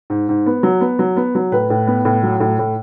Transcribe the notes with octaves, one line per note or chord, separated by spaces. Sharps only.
G#2
G#2
B3
F#3
B3
F#3
B3
F#3
A2 B4
A2
B3
A2
F#3
A2
A2